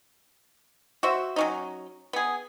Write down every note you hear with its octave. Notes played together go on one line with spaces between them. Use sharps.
F#4 C5 E5
F#3 C#4 D#4
B3 G#4